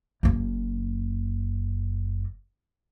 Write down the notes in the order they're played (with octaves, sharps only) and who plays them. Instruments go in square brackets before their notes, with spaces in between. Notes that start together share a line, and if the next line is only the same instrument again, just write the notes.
[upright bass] F#1 A#3